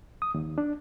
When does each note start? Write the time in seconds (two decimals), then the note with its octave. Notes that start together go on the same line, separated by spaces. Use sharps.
0.22 D#6
0.34 D#2
0.58 D4